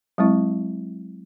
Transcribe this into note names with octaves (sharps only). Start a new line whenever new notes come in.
F#3 G#3 C4 E4